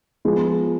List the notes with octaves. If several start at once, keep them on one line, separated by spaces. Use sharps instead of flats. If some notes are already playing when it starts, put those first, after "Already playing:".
F3 G#3 B3